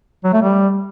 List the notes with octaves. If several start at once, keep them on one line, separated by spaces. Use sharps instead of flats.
F#3
A3
G3